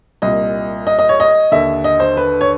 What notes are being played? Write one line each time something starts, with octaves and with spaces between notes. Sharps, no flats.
C2 A#2 D#5
D#5
D#5
C#5
D#5
D#2 D3 E5
D#5
C5
B4
C#5